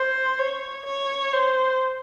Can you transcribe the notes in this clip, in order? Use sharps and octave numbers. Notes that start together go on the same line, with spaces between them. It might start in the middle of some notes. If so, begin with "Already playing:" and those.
Already playing: C5
C#5
C#5
C5